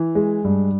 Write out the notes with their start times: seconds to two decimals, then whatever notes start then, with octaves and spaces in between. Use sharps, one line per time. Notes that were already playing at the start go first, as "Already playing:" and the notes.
Already playing: E3
0.15 G#3
0.44 G2